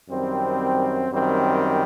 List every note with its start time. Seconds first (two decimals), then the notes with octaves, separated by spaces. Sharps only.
0.09 F#2 D#3 G3 C4
1.11 F#2 D#3 G3 C4